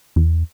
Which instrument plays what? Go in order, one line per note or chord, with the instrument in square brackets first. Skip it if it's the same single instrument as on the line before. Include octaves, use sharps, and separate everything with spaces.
[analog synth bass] E2